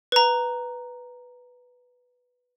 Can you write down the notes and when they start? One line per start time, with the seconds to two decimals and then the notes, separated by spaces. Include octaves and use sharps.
0.12 B4 A#5